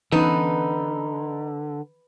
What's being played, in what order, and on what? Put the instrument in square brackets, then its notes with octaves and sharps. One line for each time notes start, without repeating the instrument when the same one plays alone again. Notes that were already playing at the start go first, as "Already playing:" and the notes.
[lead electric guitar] D3 [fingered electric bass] E3 B3 C#4 [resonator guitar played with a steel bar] D#4 [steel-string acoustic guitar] B4